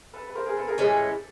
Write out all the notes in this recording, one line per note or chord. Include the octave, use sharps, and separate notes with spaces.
A4 B4
B4
A#4 C5
G#4 A#4
A4 B4
G#4 A#4
A2 E3 G#3 C#4 G4 A4